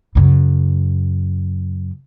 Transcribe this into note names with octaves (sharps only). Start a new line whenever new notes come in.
F#2 C#3